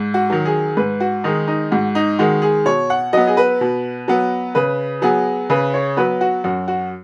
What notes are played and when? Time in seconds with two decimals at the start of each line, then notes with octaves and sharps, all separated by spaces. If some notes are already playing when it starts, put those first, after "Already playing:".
Already playing: G#2
0.14 F#4
0.30 D#3 F#3
0.45 G#4
0.77 G#2 B4
1.00 F#4
1.24 D#3 G#3 D#4
1.47 D#4
1.71 G#2 F#4
1.95 D#4
2.19 D#3 G#3 F#4
2.42 G#4
2.65 B2 C#5
2.90 F#5
3.13 F#3 B3 D#5
3.27 G#4
3.37 B4
3.61 B2
4.08 F#3 B3
4.55 C#3 B4
5.02 F#3 B3 G#4
5.50 C#3 B4
5.74 C#5
5.97 F#3 B3 B4
6.21 F#4
6.44 F#2 F#4
6.68 F#4